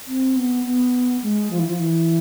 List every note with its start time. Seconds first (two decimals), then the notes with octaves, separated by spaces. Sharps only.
0.07 C4
0.36 B3
0.65 B3
1.23 G#3
1.51 F3
1.59 E3
1.66 F3
1.79 E3